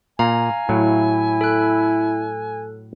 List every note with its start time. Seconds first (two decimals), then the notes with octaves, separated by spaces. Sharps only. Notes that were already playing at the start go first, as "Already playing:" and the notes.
0.19 A#2 F5 G#5 A#5
0.69 A2 F#3 E4
1.41 A4 F#6